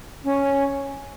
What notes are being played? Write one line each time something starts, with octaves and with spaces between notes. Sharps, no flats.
C#4